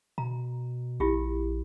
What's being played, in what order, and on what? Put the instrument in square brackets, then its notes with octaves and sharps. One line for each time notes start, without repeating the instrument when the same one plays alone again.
[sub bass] B2 [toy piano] A#5
[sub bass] A#1 [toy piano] E4 F4 G4